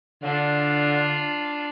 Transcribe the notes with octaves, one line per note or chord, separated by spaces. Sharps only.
D3 D4 F4